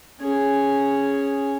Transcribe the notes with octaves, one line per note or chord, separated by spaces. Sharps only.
C#4 G#4